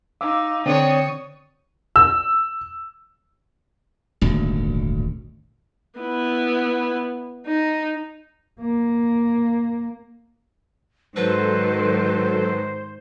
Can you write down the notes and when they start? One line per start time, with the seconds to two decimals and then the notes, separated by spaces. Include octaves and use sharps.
0.21 D#4 F5 D6 E6
0.66 D3 C4 D4 C#5 C#6 D#6
1.96 E6
4.21 D#1 G#1 D2
6.00 B3 E4
7.47 D#4
8.61 A#3
11.16 G#2 D#3 F#3 A4 B4 C5